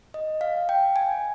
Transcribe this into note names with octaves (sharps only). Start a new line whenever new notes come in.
D#5
F5
G5
G#5